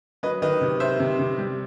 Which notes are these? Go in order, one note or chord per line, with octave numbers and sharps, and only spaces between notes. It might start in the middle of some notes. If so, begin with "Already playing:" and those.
F#3 B4 D#5
D#3 B4 D#5
C3
C3 C5 E5
C3
C3
G3